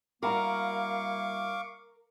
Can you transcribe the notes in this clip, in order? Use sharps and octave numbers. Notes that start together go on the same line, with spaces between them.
G3 A#3 E4 F#4 A#4 F5 C#6 D6